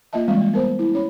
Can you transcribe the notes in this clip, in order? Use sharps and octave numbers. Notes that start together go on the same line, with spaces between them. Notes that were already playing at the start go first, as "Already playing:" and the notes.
A#3 F4 D#5 E5 A5
E3 G3 G#3 C4
A#3
B3 A#4 C5
E4
C#4 C#5 B5